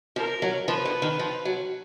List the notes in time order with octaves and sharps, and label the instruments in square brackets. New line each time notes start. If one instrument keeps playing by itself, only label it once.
[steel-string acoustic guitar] F3 [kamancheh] A#4
[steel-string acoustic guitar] F#3
[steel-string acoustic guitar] F3 [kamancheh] B4
[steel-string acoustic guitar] D3
D#3
F3
F#3